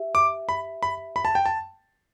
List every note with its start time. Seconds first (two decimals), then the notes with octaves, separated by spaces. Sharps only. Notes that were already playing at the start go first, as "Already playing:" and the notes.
Already playing: G4 E5
0.15 D6
0.49 B5
0.83 B5
1.16 B5
1.25 A5
1.35 G5
1.46 A5